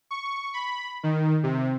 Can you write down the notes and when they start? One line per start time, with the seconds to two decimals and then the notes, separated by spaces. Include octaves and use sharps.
0.11 C#6
0.54 B5
1.03 D#3
1.43 C3